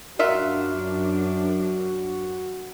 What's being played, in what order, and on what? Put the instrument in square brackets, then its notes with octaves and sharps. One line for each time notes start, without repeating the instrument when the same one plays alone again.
[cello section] F#2 D4 [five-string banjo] F4 E5 F#5 [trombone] F#4 [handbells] A#4